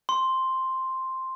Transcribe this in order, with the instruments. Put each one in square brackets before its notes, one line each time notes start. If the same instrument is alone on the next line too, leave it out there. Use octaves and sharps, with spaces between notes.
[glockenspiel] C6